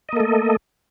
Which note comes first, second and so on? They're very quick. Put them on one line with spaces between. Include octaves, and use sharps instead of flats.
D#5 A#3 A4 A3